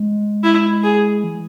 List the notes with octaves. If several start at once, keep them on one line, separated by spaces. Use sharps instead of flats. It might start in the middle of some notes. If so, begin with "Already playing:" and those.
Already playing: G#3
E4
G#4
E3